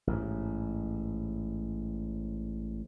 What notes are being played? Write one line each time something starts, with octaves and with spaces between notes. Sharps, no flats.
A1 G#2